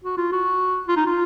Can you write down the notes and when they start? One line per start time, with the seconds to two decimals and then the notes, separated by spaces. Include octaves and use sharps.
0.04 F#4
0.17 F4
0.32 F#4
0.88 F4
0.96 D#4
1.07 F4